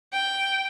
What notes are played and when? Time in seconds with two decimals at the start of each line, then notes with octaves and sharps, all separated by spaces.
0.13 G5